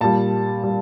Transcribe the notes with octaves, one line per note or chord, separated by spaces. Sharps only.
A#2 G3 A5
G3